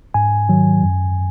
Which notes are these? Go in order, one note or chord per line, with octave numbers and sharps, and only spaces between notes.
G#2 G#5
D#3 F#3
F#2